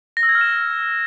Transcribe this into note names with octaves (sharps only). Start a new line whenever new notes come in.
A#6
E6
G#6
F6
E7